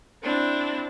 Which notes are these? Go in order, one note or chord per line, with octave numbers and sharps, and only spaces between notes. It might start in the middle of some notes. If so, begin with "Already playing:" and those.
C4 D4 E4